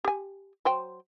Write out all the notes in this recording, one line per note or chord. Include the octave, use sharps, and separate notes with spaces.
G4 G#5
F#3 C5 G5